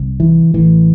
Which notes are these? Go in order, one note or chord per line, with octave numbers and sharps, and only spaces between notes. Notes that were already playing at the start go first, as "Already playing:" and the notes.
Already playing: C2 C3
E3
A1 A2 E3